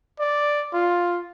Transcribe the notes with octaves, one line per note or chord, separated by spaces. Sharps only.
D5
F4